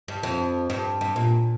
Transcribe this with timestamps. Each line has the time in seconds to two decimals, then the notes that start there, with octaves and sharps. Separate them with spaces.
0.08 G2
0.23 F2
0.70 G2
1.01 G2
1.16 A#2